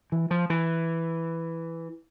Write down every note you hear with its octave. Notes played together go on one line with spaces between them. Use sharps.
E3
F3
E3